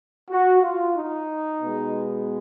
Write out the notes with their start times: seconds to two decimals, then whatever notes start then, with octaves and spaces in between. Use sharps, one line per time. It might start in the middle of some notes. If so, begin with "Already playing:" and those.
0.30 F#4
0.63 F4
0.96 D#4
1.62 B2 G#3 B3